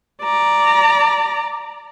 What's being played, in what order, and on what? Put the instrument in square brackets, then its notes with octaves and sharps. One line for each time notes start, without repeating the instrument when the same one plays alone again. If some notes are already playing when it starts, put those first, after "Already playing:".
[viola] D5 A#5